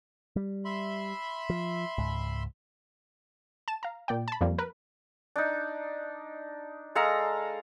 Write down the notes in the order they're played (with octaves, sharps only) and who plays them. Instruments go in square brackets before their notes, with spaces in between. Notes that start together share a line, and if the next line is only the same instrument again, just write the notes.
[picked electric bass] G3
[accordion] E5 B5 C6
[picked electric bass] F3
C#2 G#2
[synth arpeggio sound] A5 E7
F5 A#5
A#2 D5 G5
A5 B5
F2 F3 G3 A#3
A#4 B4
[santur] D4 D#4
G#3 A4 F5 A#5